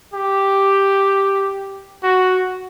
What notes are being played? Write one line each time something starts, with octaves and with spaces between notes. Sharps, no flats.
G4
F#4